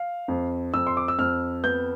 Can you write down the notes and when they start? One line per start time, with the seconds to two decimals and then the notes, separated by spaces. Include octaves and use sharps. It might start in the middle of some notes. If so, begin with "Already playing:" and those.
Already playing: F5
0.28 F2
0.74 F2 E6
0.87 C6
0.97 D6
1.08 E6
1.19 F2 F6
1.64 B3 G6